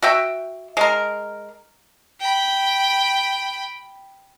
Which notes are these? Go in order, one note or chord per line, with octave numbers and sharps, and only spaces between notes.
F#4 E5 G5
G#3 A#4
G5 B5